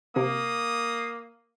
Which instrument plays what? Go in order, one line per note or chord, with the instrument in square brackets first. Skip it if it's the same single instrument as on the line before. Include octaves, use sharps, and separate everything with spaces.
[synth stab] C3 [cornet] A#3 [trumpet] D#6